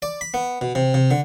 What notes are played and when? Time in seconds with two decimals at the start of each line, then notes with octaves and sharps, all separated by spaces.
0.02 D5
0.21 B5
0.34 B3
0.61 B2
0.75 C3
0.94 C3
1.11 D3